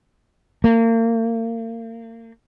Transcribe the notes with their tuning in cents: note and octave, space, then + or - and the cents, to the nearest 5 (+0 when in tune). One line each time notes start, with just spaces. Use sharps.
A#3 -35